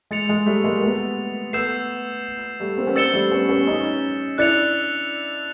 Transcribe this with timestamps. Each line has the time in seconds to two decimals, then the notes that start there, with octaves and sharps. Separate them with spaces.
0.11 G#3 A6 C#7 F7
0.29 G#3
0.46 G3 A3
0.64 G#3 A#3
0.82 A3 B3
1.53 A3 B3 E6 G6 C7 E7
2.60 G3 A3
2.78 A#3 C4
2.87 B3 C#4
2.96 C4 D4 E6 A6 C#7 E7 G7
3.13 G3 A3
3.32 B3 C#4
3.49 B3 C#4
3.67 C#4 D#4
4.38 D4 E4 F#6 A6 C#7 F7